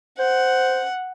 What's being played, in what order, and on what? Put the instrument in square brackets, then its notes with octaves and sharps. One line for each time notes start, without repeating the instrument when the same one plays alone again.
[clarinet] C5 [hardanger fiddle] F#5